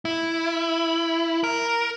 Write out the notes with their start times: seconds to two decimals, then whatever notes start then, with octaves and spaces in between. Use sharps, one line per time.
0.05 E4
1.44 A#4